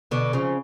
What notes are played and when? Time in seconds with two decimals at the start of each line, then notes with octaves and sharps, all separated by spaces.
0.11 B2 D3
0.33 C#3 F3